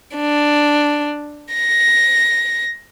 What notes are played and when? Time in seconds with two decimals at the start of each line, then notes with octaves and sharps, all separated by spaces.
0.16 D4
1.54 A#6